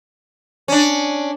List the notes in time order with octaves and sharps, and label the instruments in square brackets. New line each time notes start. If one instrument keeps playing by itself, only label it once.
[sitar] C#4 D4